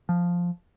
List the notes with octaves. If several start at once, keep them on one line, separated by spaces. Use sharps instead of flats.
F3